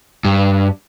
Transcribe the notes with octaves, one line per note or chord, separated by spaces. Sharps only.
G2